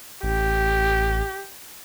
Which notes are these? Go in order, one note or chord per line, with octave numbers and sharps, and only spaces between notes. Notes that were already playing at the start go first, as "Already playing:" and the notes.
A1 G4